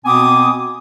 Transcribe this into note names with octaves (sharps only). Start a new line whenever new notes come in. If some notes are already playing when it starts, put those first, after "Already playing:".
B2 B3 C4 G#5 D6 D#6